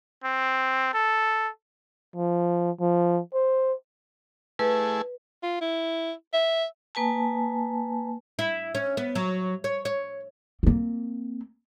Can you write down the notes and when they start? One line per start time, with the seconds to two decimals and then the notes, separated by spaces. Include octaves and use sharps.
0.24 C4
0.94 A4
2.16 F3
2.80 F3
3.34 C5
4.59 A3 E4 G#4 B4
5.43 F4
5.61 E4
6.33 E5
6.95 A#3 B4 G#5 A5
8.39 E4
8.75 C#4
8.97 B3
9.15 F#3
9.64 C#5
9.85 C#5
10.63 A#3 C4